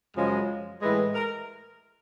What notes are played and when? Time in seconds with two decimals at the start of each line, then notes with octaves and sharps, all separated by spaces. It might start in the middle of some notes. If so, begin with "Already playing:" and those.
0.16 F#2 C#3 F3 G#3
0.82 A2 E3 G#3 B4
1.14 A#4